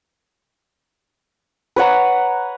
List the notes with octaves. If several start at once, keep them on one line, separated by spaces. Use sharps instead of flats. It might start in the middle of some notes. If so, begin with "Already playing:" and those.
B4 C#5 F#5 A#5